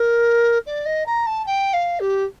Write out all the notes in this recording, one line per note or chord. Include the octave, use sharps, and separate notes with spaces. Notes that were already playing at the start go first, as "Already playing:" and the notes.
Already playing: A#4
D5
D#5
A#5
A5
G5
F5
G4